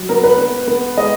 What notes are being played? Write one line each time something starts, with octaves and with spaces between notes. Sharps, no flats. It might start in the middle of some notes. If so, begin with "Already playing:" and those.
Already playing: F#3
B3 A#4
B4
B3 B4
B3
G#3 D#5